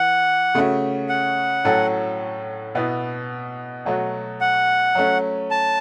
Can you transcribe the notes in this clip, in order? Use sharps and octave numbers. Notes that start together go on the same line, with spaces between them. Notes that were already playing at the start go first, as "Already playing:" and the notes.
Already playing: E3 F#5
C#3 A3 C#4 F#4
F#5
A2 F#3 C#4 F#4 A4
B2 B3 E4
B2 F#3 A3 F#4
F#5
F#3 A3 C#4
A5